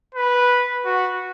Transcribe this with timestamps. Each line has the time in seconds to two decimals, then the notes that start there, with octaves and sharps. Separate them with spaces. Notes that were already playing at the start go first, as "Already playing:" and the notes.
0.14 B4
0.85 F#4